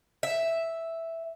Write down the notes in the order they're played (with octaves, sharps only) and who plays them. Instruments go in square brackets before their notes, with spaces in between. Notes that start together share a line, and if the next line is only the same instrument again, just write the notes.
[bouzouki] E5